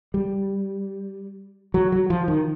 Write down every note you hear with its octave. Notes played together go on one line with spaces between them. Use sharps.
G3
F#3
F#3
F3
D#3